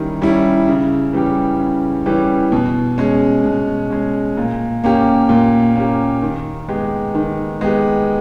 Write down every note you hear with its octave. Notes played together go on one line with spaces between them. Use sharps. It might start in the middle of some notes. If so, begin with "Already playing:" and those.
Already playing: D#3 G3 C#4 E4
G3 C#4 E4
C#3
E3 G3 C#4 G4
C#3
E3 G3 C#4 G4
B2
G#3 C#4
B2
G#3 C#4
A#2
A#3 C#4 G4
A#2
A#3 C#4 G4
D#3
G#3 B3 G4
D#3
G#3 B3 G4